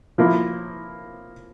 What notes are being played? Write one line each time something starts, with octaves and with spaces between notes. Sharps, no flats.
F3 A#3 E4